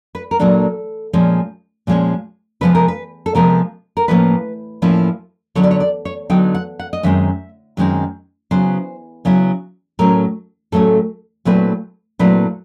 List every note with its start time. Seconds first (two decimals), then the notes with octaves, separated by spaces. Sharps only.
0.15 B4
0.31 A#4
0.39 A#2 F#3 A#3 D4 A4
1.13 A#2 F3 G#3 C#4
1.87 A#2 F3 G#3 C#4
2.61 C3 F3 G#3 B3 B4
2.75 A#4
2.88 B4
3.26 A4
3.35 C3 F3 G#3 B3 A#4
3.97 A#4
4.08 A2 F3 A#3 C#4 E4 B4
4.82 A2 F3 A#3 C#4 E4
5.55 D3 F#3 B3 D#4 C#5
5.63 D5
5.71 C#5
5.80 D5
6.05 C#5
6.30 D3 F#3 B3 D#4 G5
6.55 F#5
6.79 F#5
6.93 D#5
7.03 F#2 D#3 G#3 C4 D#4 E5
7.77 F#2 D#3 G#3 C4 D#4
8.51 C#3 F#3 B3 E4 C5
9.25 C#3 F#3 B3 E4
9.99 A2 F#3 A3 C#4 A#4
10.72 A2 F#3 A3 C#4 A4
11.45 A#2 F#3 A3 C4 E4 B4
12.19 A#2 F#3 A3 C4 E4 B4